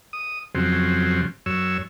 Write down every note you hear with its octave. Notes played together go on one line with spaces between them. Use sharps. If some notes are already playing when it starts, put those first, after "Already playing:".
D#6
F2 C#3 F#3 C4
F#2 C#5 E6